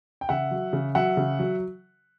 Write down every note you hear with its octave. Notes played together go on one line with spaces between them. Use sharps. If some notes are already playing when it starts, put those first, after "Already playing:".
G5
C#3 E5 F#5
F#3
C#3
F#3 E5 F#5
C#3
F#3